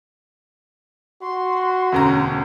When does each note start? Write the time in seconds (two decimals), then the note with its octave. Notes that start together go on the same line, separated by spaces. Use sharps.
1.22 F#4 C6
1.92 E1 D2 C#4 A#5